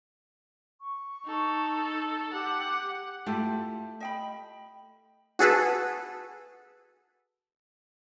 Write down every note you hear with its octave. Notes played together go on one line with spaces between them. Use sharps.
C#6
D#4 A4
G4 F#5
A3 E4 F4 G4
D#5 G5 B5
F#4 G#4 A4 B4